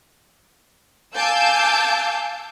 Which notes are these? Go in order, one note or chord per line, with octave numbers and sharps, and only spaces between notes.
F5 G#5 A5 D6 E6 G6